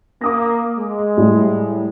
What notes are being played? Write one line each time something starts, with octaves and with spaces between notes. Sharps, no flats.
A#3 D6 D#6 A#6
G#3
A2 G3